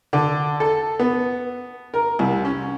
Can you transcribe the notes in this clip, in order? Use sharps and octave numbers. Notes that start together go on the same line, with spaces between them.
D3
A4
B3
A#4
C2
C#4